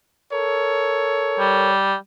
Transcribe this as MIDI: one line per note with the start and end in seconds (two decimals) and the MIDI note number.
0.31 1.71 69
0.31 1.71 70
0.31 1.71 73
1.39 1.96 55